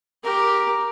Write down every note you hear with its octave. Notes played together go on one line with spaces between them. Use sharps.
G4 A#4